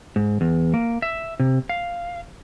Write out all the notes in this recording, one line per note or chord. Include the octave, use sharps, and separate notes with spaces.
G#2
E2
A#3
E5
C3
F5